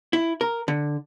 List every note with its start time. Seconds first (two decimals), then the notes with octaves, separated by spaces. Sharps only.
0.13 E4
0.41 A#4
0.68 D3